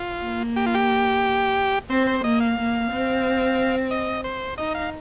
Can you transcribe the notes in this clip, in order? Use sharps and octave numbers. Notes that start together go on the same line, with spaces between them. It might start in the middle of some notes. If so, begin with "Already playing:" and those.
Already playing: F4
A#3
G4
F4
G4
C4 C5
C5
A#3 D#5
F5
A#3
C4
D#5
C5
D#4 D#5
F5